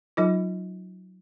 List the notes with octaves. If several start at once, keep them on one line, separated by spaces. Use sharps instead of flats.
F#3 D#4 F4